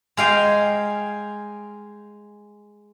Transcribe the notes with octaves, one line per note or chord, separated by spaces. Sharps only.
G#3 F5 G5 G#5